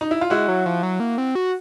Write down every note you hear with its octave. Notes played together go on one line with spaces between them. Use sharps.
D#4
E4
F4
G#3 E4 F#4
F#3
F3
F#3
A#3
C4
F#4